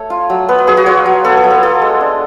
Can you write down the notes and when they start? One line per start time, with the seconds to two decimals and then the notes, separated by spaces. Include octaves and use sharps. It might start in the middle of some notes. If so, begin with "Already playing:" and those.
Already playing: A3 A4 C#5
0.10 F4
0.30 F#3
0.48 B3 B4
0.58 B4
0.67 F#3 G#4
0.77 F#4
0.86 F4 C#5
1.06 F#3
1.24 B3 A4
1.37 A4
1.44 F#3
1.50 A4
1.63 F4 A4
1.82 G#3
2.01 D4